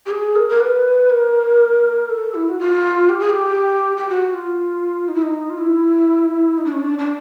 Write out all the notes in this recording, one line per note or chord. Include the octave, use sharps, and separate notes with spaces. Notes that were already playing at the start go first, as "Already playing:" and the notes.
G4
G#4
A#4
A#4
B4
A#4
A4
E4
F#4
F4
G4
G#4
G4
G4
F#4
F4
D#4
E4
D#4
F4
E4
D#4
D4
C#4
D4
D4